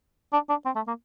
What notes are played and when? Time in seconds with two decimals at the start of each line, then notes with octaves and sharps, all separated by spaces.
0.33 D4
0.49 D4
0.65 C4
0.76 A3
0.88 A#3